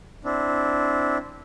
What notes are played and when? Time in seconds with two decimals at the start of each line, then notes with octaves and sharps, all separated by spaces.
0.25 C4 D4 E4